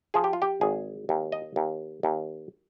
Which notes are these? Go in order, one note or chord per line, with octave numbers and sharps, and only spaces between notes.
F3 G#4
G4
F4
G4
G#1 G#4
D#2
D#5
D#2
D#2